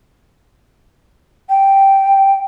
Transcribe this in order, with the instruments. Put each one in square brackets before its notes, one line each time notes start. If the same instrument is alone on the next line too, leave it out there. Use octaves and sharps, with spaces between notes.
[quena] G5